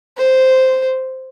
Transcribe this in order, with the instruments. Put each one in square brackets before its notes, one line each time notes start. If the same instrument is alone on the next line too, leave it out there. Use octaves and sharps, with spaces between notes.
[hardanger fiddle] C5